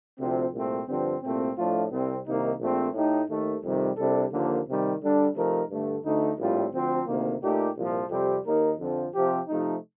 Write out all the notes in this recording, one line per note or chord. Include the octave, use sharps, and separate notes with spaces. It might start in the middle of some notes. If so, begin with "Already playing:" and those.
D2 C3 F3 C4
C2 A#2 A3 C4
G2 D3 F3 C4
C2 A#2 A3 C4
A2 F3 A3 D4 F4
C2 C3 G3 C4
C2 C3 D#3 A#3 D#4
A#1 A#2 A3 C4
A2 A3 D#4 G4
D#2 D#3 A3
F2 C3 D#3 G3
C2 C3 G3 D4 A4
D#2 D3 F3 A#3
C3 D#3 G3
D3 G3 D4 A4
C3 F3 A3 D#4 A#4
G2 D3 A3
D2 D3 A3 D#4
A#1 A2 G3 C4 F4
D2 D3 F3 C4
D2 C3 D#3 A#3
A#2 A3 D#4 G4
C2 A#2 F3
F2 C3 G3 C4 G4
D#2 D#3 A#3 D#4 A#4
F2 D3 F3 C4
C3 F3 C4 G4
C3 F3 A3 D#4